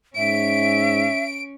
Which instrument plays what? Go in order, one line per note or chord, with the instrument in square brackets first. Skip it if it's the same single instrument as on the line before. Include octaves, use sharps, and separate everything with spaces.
[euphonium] G#2 [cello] C#4 [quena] E5 [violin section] D7